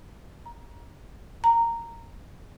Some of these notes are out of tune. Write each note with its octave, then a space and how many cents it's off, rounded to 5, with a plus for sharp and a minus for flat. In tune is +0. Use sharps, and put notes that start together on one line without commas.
A#5 +20
A#5 -10